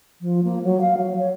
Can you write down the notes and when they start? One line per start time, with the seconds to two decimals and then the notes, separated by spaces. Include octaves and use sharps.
0.21 F3
0.44 A#3
0.64 F#3
0.81 F5
0.98 F#3
1.18 C#5